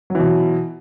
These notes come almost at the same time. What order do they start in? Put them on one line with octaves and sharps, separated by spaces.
F#3 E3 B2